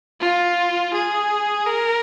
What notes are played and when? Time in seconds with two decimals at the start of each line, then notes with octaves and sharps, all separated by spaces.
0.20 F4
0.93 G#4
1.66 A#4